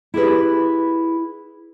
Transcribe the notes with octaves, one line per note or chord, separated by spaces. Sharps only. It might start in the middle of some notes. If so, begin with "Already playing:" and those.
E4 G4 G#4 B4